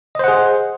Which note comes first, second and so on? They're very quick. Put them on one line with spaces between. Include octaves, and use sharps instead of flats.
D#5 C5 F#5 G#4